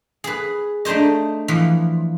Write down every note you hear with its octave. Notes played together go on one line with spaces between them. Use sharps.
G#4 B4
A3 D4 D#4 C5 D#5
E3 F3